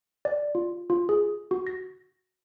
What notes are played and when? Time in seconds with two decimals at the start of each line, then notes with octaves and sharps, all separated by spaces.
0.25 D5
0.55 F4
0.90 F4
1.09 G#4
1.51 F#4
1.67 A#6